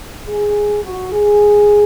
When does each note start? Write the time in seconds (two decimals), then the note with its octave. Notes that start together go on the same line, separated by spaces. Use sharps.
0.28 G#4
0.84 F#4
1.13 G#4